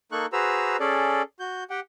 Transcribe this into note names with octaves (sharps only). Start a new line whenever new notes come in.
A#3 D#4 A4 C#6 F#6
F#4 G#4 B4 C5 A#5 E6
C#4 G#4 A4 D5
F#4 G6
G4 F#5 G5